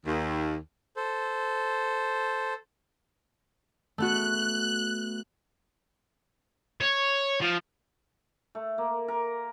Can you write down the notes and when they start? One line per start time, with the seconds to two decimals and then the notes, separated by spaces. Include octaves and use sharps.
0.06 D#2
0.97 A4 C5
3.98 A3 B3 F#4 F#6
6.81 C#5
7.41 F3
8.55 A3
8.78 A#3
9.08 A#4